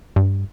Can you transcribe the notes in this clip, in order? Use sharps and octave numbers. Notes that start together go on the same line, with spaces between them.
G2